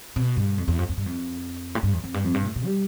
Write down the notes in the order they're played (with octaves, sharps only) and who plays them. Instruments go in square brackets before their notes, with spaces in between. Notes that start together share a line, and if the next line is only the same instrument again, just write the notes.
[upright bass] B2
G2
F2
E2
F2
F2
G2
F2
A2
G2
E2
F2
G2
F2
G2
B2
A2
B2
G3